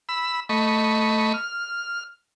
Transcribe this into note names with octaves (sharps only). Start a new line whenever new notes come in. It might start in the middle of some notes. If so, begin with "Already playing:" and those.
B5 E6
A3 D#5 B5 C#6
F6